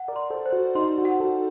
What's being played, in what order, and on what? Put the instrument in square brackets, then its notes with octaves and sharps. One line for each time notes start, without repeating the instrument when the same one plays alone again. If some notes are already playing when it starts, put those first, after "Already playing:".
Already playing: [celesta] F#5
[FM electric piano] A#4 D5
[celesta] C6
[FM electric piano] A4 C5
[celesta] C5
[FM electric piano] F#4
[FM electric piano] D#4 [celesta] C6
[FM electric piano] F#4
[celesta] F#5
[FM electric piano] F#4 A4